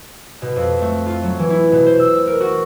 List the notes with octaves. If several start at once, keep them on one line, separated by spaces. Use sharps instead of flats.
B2
F2
A3
F4
F#3
E3
E4
B2
C5
E6
A#4
F#4